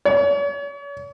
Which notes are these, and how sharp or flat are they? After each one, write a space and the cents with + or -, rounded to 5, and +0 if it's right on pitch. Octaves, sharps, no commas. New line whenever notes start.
C#5 +40